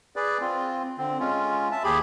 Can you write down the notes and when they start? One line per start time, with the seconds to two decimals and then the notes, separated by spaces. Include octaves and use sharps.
0.16 G#4 B4 D5
0.41 C4 F4
0.98 D3 C4
1.20 G#3 C#4 F4
1.71 E5 A5
1.84 D#2 G4 G#4 B5